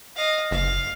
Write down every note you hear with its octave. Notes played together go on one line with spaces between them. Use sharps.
D#5 F5
F#1 F5